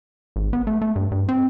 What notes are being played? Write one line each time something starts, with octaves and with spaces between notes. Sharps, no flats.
G#1
B3
A3
A3
G2
G2
C4